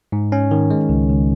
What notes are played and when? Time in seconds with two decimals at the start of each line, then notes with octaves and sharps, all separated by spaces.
0.12 G#2
0.32 C#4
0.51 D#3
0.71 G#3
0.89 C#2
1.09 C#2